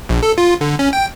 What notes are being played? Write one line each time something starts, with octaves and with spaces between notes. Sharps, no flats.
A#1
A4
F4
D3
C#4
G5